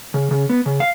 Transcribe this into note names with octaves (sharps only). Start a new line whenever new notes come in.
C#3
C#3
B3
C#3
F5